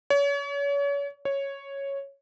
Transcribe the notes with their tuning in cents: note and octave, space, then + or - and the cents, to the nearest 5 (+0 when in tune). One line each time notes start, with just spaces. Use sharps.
C#5 +35
C#5 -5